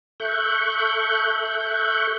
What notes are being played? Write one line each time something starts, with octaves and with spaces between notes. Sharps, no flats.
A4 E5 C#6 F#6 G6